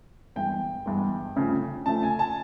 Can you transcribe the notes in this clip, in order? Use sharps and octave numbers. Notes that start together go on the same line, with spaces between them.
G2 E3 G#3 B3 G5
G2 E3 G#3 B3
C#3 F3 A3
C#3 F3 A3 A5
G#5
A5